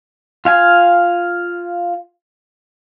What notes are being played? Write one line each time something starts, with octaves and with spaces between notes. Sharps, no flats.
F4 F5 G#5